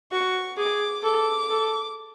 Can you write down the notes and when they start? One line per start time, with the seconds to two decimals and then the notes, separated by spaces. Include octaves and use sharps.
0.12 F#4 C#6
0.57 G#4 D6
1.03 A4 D6
1.49 A4